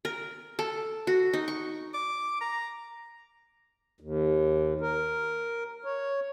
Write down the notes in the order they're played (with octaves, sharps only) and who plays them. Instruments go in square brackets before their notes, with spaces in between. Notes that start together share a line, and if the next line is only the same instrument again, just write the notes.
[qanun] A#4
A4
F#4
D#4
C#6
[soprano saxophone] D6
A#5
[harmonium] D#2
A#4
C#5